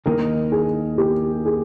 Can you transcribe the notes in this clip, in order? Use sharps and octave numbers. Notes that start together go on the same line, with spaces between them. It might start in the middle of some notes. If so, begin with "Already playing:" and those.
D#2 D#3 A#3 D#4 A#4
G#4
G4
G#4